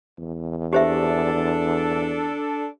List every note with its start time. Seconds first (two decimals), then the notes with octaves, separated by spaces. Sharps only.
0.19 E2
0.73 D4 G4 A4 C5 E5